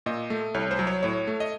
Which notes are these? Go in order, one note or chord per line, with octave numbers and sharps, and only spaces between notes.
A#2 D#5
A3
C2 C#5
C5
F#3
C#5
A2 C#5
A3
D#5